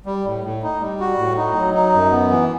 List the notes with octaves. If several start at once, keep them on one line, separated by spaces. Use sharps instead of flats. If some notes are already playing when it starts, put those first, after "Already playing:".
G3
A2
A2
D#4
G3
F#4
A2
D#4
F#3
D#4
F#2
B3
E3